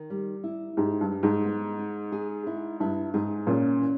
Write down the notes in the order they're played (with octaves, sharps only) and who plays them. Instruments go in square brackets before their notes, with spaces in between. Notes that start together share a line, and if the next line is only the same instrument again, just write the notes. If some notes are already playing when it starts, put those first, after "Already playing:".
Already playing: [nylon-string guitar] D#3
G3
E4
[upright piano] G#2 [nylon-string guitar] G4
[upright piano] G2
[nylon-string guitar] G3
[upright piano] G#2
[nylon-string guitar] B3
D#4
G#4
E4
[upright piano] G2 [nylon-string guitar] E4
[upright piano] G#2 [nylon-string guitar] G#4
[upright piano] A#2 [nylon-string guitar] C#4
[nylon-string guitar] E3